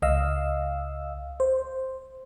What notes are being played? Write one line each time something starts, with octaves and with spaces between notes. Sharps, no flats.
C#2 D#5 F5 E6
C5